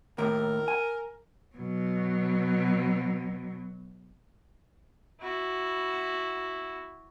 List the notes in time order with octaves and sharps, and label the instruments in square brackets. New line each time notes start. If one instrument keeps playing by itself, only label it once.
[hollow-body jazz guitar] D#2 A2 [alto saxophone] A#4
[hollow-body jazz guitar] G#5
[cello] B2 F#3
[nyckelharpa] E4 F#4